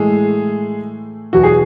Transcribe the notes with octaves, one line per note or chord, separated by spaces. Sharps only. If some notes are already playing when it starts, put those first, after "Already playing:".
Already playing: A2 E3 G#3 A3 G#4
E2 B2 F#3 F#4
G#4